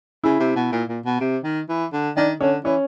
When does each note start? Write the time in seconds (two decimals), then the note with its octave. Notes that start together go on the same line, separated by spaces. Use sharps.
0.24 C#3 E4
0.40 C3
0.56 B2
0.72 A#2
0.89 A#2
1.05 B2
1.20 C3
1.44 D#3
1.69 E3
1.93 D3
2.17 D#3 D4
2.40 D3 C#4
2.65 E3 C#4